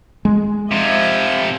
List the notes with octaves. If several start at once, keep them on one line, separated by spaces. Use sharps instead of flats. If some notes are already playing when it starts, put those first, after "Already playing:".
G#3
C3 F3 D#5 E5 G#6